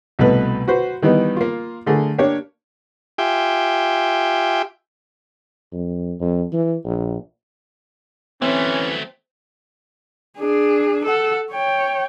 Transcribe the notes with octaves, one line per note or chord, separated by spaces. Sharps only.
C2 B2 A3 B4
F#4 B4 C5
D#3 E3 G3 B3 D#4
A#3 F4
D3 A3 G#4 A#4
A#3 D4 G4 C#5
F4 G4 E5 G5 G#5
F2
F2
E3
A#1
E3 F#3 A3 C4 C#4
D4 G#4
A4 F#5
C#5 G5